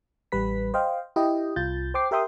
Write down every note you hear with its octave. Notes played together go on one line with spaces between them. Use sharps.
A1 G3 B4 B6
C5 D#5 F5 G5
E4 G4 D#5 G5
C2 F4 G6 A6
C5 G5 D6 C7
G4 A#4 E5 G5 C6 D#6